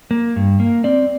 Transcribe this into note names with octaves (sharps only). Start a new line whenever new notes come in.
A#3
G2
A#3
C4 D5